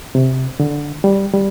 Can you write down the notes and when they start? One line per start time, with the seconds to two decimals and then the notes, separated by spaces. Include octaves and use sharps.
0.15 C3
0.60 D3
1.04 G3
1.34 G3